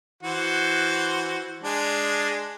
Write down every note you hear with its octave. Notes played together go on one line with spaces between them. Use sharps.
E3 F#4 C5
G#3 D4